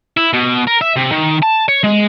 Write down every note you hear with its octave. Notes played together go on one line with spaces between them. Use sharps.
E4
B2
A#4
E5
C3
D#3
A5
C#5
G#3